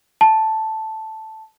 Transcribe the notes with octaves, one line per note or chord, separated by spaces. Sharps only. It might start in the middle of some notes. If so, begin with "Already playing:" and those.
A5